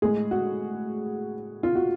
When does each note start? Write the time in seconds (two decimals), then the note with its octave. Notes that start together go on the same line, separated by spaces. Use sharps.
0.02 A2 G#3 G#4
0.31 F#4
1.63 F4
1.75 F#4